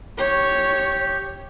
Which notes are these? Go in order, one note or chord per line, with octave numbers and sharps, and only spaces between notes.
G4 C#5